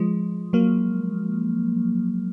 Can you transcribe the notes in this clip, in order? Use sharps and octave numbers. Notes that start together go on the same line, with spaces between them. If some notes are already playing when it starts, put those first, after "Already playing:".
Already playing: F3 G#3
F#3 A#3